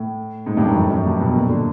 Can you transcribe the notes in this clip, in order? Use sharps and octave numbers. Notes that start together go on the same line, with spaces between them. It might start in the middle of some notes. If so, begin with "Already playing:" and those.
Already playing: A2
G#2
G2
F#2
F2
F#2
G2
B2
A#2
D3